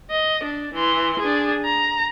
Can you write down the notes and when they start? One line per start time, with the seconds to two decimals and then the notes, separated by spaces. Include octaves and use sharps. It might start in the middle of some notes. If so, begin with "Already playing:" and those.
0.11 D#5
0.43 D4
0.74 E3 C6
1.20 D4 G#4
1.65 A#5